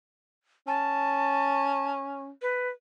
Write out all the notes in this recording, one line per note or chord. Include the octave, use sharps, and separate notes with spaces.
C#4 A5
B4